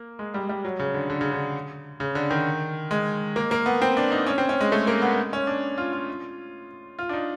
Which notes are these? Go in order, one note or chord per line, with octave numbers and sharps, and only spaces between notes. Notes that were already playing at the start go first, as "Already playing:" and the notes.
Already playing: A#3
G#3
G3
G3
F#3
C#3
D3
D3
C#3
D3
C#3
D3
D#3
G#3
A#3
A#3
B3
C4
D4
D#4
C#4
C4
C#4
G#3
A3
A#3
B3
C#4
D4
F4
F4
F4
D4
D#4